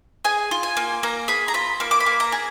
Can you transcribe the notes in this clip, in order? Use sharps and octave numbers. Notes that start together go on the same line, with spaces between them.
G#4 G#5
F4
G#5
A#3
A#3 A#5
G#4 B5
A#5
F4 B5
A#3 D6
D6
B5
A#3
A#5
G#4